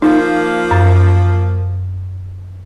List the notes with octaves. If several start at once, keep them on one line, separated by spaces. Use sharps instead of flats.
F3 A#3 D#4
F#2